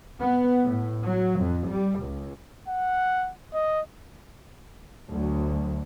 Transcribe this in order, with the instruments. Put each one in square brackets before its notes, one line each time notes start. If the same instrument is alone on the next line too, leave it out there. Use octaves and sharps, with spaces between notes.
[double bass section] B3
A2
F#3
F2
G3
C#2
[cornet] F#5
D#5
[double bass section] D2 F#3